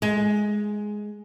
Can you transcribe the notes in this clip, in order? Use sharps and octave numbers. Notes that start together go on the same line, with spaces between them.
G#3